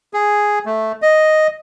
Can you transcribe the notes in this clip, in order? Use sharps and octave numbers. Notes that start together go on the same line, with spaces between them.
G#4
A3
D#5